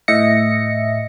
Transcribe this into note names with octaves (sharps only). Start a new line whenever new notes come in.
A2 D#5 E5 A#6 C#7